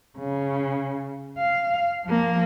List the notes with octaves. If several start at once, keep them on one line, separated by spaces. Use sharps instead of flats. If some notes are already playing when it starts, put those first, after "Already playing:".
C#3
F5
F3 A#3